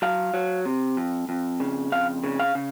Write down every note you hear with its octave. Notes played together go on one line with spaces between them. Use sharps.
F#3 F5
F#3
C3
F2
F2
C#3
F2 F5
C#3
F5
C#3